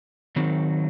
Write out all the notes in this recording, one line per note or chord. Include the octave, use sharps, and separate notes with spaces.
D#3 F#3 C4 D#4